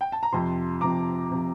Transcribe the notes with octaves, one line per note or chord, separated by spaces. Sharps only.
G5
A5
A#5
F2 C3 F3 A5 C6
F2 C3 F3 A#5 D6
C3 F3